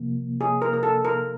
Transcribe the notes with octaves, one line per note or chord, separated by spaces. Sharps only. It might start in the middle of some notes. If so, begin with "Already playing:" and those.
Already playing: C3 F3 A#3
G#4
A#4
A#4
A4
A#4